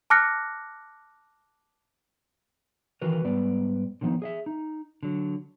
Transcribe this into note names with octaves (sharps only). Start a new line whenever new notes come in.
A5 D6 F6 F#6 A#6 C#7
D#3 E3 F#4 A#4 B4
G#2 G3 B3 B4 D5
D3 D#3 F3 A#3 B3 D#4
G#4 D#5 E5
D#4
D3 F#3